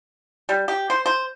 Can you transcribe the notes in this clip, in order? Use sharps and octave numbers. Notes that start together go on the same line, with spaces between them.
G3
G4
C5
C5